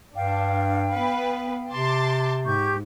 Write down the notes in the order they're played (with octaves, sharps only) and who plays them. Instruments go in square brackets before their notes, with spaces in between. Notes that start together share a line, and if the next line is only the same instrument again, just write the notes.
[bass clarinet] G2 [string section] D4 [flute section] F5 G5
[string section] B3 B4
[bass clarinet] C3 [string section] A5 C6 D6
[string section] G#2 [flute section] G4 C#6 G6